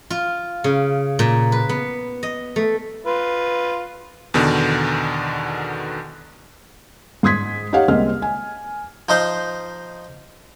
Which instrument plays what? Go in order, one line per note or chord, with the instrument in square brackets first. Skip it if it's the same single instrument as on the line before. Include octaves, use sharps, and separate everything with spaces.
[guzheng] F4
C#3
A#2
B4
B3
D#5
A3
[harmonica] F4 B4
[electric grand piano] E2 B2 D3 D#3
[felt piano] G#2 C6 D#6 G#6 B6
D#4 G4 C#5 F5 F#5
C2 G#3 A#3 C4 D#5 F6
G#5
[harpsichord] F3 D#4 C5